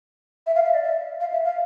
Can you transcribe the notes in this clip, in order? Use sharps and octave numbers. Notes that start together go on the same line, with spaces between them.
E5
F5
E5
D5
E5
F5
E5
F5